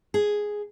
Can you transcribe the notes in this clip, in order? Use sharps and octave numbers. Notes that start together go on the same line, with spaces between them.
G#4